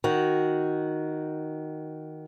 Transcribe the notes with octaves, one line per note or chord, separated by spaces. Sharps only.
D#3 F#4